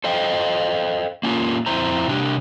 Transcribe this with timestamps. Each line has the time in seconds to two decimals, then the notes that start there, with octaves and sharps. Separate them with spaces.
0.04 A4 C5 D#5 F5 G5
1.23 A#3 C#4 F4 A#4
1.66 F2 C4 E4 C5 A#5
2.08 C3 D4 G4